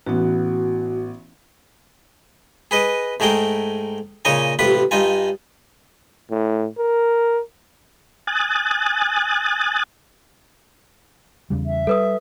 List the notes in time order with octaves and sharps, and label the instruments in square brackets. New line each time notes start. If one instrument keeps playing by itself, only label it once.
[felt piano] A1 B3 [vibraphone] F#4
[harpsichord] G#4 B4 D#5
G#2 A3 G#4 A#4 G5
A#2 C#3 D#4 C#5 D#5 G#5
A1 C3 F4 B4 B5
G2 D#4 F4 G#5
[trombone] A2
A#4
[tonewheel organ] G#5 D#6 F#6 A6
[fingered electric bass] E2 C#3 G3
[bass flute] E5
[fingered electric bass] G3 [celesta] A4 B4 D#6